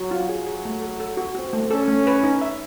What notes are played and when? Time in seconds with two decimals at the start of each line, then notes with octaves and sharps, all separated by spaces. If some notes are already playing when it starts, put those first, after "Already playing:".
Already playing: F#3
0.11 F4
0.29 F#3 G#4
0.46 G#4
0.65 A3
0.82 A4
1.00 A4
1.17 F#4
1.35 C4 F#4
1.53 A3
1.70 C#4 A4
1.88 A3
2.07 B4
2.23 D#4
2.41 E5